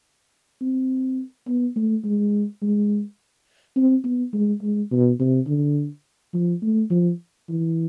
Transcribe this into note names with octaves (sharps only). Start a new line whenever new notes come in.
C4
B3
A3
G#3
G#3
C4
B3
G#3
G#3
B2
C3
D3
F3
A3
F3
E3